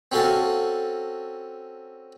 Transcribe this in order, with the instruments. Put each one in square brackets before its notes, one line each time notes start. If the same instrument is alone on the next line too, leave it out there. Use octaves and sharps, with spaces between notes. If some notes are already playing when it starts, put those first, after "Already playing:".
[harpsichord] C4 C#4 F#4 A4 F5 A5